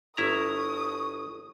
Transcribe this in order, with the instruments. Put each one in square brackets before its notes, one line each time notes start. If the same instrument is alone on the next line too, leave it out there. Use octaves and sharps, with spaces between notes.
[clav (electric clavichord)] G1 E4 A#5 [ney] C#6 [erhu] D#6